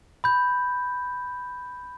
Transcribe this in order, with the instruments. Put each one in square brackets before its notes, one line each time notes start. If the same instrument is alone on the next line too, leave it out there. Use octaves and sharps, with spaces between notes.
[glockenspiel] B5 G6